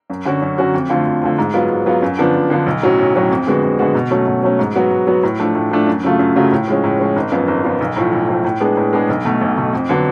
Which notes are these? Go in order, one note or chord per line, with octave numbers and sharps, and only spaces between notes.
F#2
D3 F#3 C#4 F#4
F#2
D3 F#3 C#4 F#4
F2
D3 F3 A3 F4
F2
D3 F3 A3 F4
G#2
F#3 B3 F4
G#2
F#3 B3 F4
F#2
D3 F3 B3 D4
F#2
D3 F3 B3 D4
B1
A2 F#3 C#4 F#4
B1
A2 F#3 C#4 F#4
F2
D3 G#3 B3 F#4
F2
D3 G#3 B3 F#4
B2
F#3 A3 C#4
B2
F#3 A3 C#4
G#2
F#3 B3 F#4
G#2
F#3 B3 F#4
A2
F3 A3 D4
A2
F3 A3 D4
F#2
C#3 F#3 A3 F4
F#2
C#3 F#3 A3 F4
A2
F3 G#3 C#4
A2
F3 G#3 C#4
G#1
F#2 F3 B3 F4
G#1
F#2 F3 B3 F4
B1
A2 F3 A3
B1
A2 F3 A3
A2
G#3 B3 D4 G#4
A2
G#3 B3 D4 G#4
B1
B2 A3
B1
B2 A3
F2
D3 F#3 B3 D4